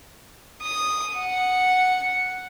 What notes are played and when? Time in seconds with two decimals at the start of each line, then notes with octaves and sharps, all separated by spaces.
0.62 D#6
1.18 F#5